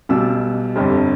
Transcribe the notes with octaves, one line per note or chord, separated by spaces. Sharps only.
B1 B2 G3 E6
G1 F2 D3 G3